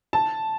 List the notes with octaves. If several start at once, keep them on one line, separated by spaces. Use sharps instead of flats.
A5